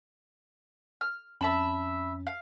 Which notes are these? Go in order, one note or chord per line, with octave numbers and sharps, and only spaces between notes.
F6
F2 C#4 E5 A5 B5
F5